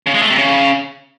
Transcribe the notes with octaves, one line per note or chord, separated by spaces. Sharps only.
C#3
G#3
A3
C3
C#3